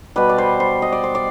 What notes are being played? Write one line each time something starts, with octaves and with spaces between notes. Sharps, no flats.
B2 G3 B4
D5
C5
C5
D#5
D5
C5
D5